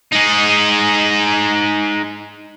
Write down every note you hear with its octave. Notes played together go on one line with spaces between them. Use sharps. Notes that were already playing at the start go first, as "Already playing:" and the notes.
G#3 D#4